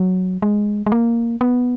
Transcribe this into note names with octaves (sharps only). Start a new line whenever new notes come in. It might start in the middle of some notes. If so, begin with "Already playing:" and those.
Already playing: F#3
G#3
G#3
A#3
B3